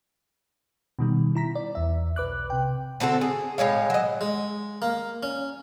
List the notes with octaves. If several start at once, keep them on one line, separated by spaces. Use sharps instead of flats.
B2 D#3 G3
E4 A#5 B6
D5
E2 E5
B1 B4 D6 F#6
C3 G5
D3 C4 F#4 A4
G#4
A2 G#3 C#5 F5
F#3 D#5
G#3
A#3
C#4